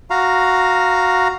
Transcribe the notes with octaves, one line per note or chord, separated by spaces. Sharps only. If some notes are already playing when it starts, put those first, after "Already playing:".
F#4 F5 A#5